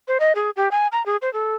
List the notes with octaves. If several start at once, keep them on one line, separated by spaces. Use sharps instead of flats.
C5
D#5
G#4
G4
G#5
A#5
G#4
C5
A4